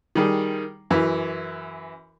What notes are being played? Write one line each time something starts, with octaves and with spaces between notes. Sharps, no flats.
D#3 G3 G#4
F#2 E3